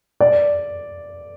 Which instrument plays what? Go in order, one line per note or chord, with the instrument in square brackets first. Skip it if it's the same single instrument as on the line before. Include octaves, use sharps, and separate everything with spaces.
[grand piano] D5